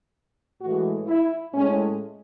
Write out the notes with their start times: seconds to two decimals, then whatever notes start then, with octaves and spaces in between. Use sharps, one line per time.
0.61 A2 E3 G#3 F#4
1.07 E4
1.54 A2 G#3 C#4